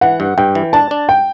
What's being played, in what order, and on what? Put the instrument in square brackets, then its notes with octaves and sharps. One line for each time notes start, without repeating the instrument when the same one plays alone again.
[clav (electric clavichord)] E3 [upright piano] F#5
[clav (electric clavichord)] G2
[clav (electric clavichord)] G2 [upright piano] G5
[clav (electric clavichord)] E3
[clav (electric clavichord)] D4 [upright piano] A5
[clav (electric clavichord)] D4
[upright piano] G5